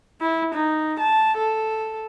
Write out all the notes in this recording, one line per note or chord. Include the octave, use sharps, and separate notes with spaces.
E4
D#4
A5
A4